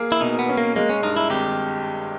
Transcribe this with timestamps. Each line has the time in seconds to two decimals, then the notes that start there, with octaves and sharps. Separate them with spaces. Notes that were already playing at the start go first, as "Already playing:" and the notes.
Already playing: A#3 G#4
0.12 E4
0.21 B2 D#4
0.39 B3
0.49 C#4
0.57 A#3
0.76 G#3 A#3
0.90 C#4
1.03 G2 D#4
1.16 E4
1.30 G#1 G4